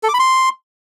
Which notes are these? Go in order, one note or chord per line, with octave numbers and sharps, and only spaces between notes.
A4
D6
B5
C6